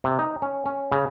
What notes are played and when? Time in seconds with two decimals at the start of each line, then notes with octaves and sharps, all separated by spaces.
0.04 C3
0.19 D#4
0.42 C#4
0.66 C#4
0.92 C#3